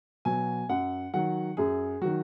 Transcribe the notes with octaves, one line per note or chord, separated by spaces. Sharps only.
B2 F#3 G#5
F#2 F#5
D#3 F#3 F#5
F#2 G#4
D#3 F#3 F#4